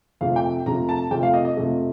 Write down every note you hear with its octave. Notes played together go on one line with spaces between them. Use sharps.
F2 C3 F3 A3 F5
G5
F2 C3 F3 A3 A#5
A5
F2 C3 F3 A3 G5
F5
D#5
D#5
F2 C3 F3 A3